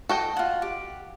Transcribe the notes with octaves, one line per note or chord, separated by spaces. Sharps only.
F#4 A4 D#5 G5
F4 F#5
G4